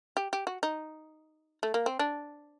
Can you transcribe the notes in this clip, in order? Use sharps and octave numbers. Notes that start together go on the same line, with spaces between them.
G4
G4
F#4
D#4
A3
A#3
C4
D4